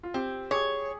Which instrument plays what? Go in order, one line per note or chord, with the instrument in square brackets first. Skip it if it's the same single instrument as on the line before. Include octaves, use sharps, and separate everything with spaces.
[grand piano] F4
[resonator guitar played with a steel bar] C4 [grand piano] G4
[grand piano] G#4 [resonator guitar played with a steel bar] C#5